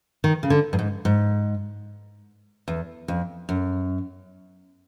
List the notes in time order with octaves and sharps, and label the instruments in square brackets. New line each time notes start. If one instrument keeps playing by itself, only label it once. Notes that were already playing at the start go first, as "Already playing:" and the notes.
[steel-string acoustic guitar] D#3
C#3
D3
G2
G#2
G#2
E2
F2
F#2